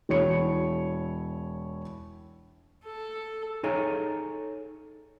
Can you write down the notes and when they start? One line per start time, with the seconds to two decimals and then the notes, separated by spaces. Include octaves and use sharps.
0.09 E1 E4 C#5 C#7
2.85 A4
3.63 D#4 G#4 A4 C#5 G#5 A#5